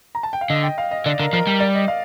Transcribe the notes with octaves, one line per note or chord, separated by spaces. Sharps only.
A#5
A5
G5
F5
D3 D#5
G5
F5
D#5
D3 D5
D3 A#4
F3 A#4
G3 A#4
D5
D#5
F5